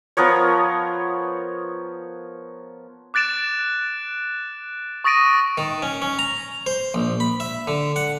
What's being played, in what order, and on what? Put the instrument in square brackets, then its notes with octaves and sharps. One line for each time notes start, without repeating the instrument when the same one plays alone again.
[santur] F3 B3 A#4 C#5
[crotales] D6 F#6 A6 D7 E7
C#6 D#6 A6 A#6 D7 D#7
[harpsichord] D#3
C#4
C#4
A#5
C5
A#1
B5
E5
D3
F#5